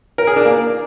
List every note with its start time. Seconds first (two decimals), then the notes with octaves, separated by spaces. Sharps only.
0.18 A#4
0.27 G#4
0.36 D4
0.45 A#3